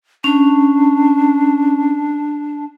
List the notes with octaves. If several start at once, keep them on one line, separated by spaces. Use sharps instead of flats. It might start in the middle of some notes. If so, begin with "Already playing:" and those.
C#4 D4